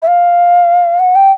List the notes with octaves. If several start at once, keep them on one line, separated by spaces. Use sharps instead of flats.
E5
F5
F#5
G5